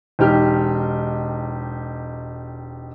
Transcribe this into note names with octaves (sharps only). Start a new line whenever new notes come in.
E1 D#4 G4 F6